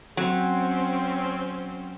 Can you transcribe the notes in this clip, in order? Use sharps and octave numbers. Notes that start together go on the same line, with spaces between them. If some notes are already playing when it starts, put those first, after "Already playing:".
F#3 C4 C#4